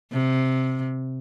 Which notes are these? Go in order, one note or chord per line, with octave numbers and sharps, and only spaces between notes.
C3